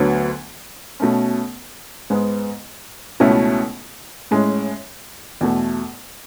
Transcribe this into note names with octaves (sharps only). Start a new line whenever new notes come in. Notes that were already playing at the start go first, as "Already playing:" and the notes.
Already playing: D2 D3 F#3 B3
B2 A3 C#4
G#2 G#3 B3
C#2 B2 A3 C#4 E4
A2 G#3 C#4
E2 B2 A3